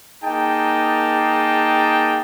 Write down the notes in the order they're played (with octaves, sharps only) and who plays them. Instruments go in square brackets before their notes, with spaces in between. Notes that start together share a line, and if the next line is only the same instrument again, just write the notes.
[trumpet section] A#3 D#4 G#4 G5 A5